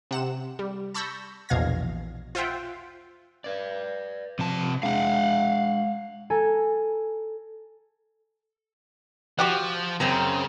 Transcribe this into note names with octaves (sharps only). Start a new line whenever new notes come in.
C3 F#5 E7
G3
A5 B5 C#6 E6 G6 A#6
A#1 E2 B2 F5 G#6 A#6
F4 C5 E5 F#5 G5
B4 D5
C3 F3 A5
G#3 D4 F5 F#5
A4 G#5 A#5
F3 F#4 G4 F#5
F#2 C#3 C4 A#5